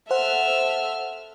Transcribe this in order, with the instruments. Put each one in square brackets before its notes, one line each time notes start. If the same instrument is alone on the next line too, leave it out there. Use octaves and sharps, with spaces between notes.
[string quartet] A4 E5 F6 [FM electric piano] C5 F#5